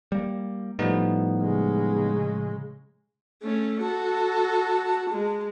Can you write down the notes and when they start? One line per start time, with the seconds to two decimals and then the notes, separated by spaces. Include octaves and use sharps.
0.12 G3 A#3
0.79 A2 F3 G3 B3 D#4
1.41 C#3 G#3
3.43 A3 C#4
3.81 F#4 A4 A5
5.10 G#3